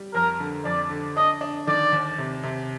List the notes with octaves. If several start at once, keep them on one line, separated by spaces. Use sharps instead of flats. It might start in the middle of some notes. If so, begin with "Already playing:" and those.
Already playing: G3
F2 A#4
D3
F2 D5
D3
D4 D#5
D4
D#3 D5
D#2
C3
C3